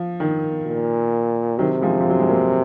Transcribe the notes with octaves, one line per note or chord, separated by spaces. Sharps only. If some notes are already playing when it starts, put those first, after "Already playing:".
Already playing: F3
D#3
A#2
C3 D#3 F#3
F3 G#3
F3
F#3
G#3
F#3 A#3